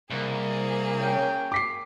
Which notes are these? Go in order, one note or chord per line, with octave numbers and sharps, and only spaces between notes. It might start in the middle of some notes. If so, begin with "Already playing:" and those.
C2 A#3 G#4
C#4 G5
D6 B6 C7